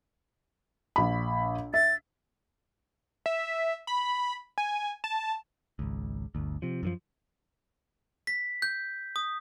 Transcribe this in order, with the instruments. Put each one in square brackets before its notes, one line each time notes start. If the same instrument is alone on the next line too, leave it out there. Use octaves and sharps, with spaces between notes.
[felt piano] A#1 B5
[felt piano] E5 [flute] A6
[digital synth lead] E5
B5
G#5
A5
[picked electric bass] G#1 C#2
G1 D2
C3 F3
F#2 D#3 F3
[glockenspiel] B6
G6
D#6